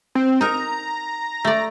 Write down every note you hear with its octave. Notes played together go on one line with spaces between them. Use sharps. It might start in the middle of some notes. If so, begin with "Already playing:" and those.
C4
D#4 A#4 A#5
A3 D5